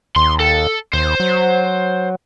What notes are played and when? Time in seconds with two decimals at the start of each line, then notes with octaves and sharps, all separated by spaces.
0.16 D#2 C6
0.40 A4
0.93 D#2 C5
1.20 F#3